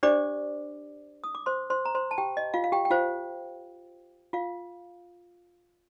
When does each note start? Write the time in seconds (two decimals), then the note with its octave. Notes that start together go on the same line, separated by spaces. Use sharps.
0.03 D4 G4 C5 D5 D6
1.24 D#6
1.35 D6
1.46 C5 C6
1.70 C5 C6
1.85 A#5
1.95 C5 C6
2.11 A5
2.18 G4 G5
2.37 D#5
2.54 F4 F5
2.64 F5
2.72 G4 G5
2.85 G5
2.90 F4 C5 F5
4.33 F4 F5